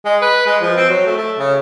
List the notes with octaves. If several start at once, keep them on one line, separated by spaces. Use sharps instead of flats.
G#3
B4
G#3
F3
C4
F#3
A3
A3
C#3